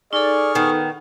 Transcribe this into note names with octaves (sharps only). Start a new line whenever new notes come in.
D#4 G#4 A4 D5 C#6 F6
D#3 B3